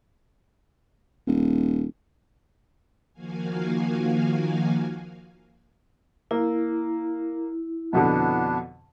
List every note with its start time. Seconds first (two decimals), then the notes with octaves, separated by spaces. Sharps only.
1.27 D#1
3.13 D#3 F3 A#3 F#4 F5 G#5
6.31 A#3 E4
7.93 F2 B2 D3 B3 D4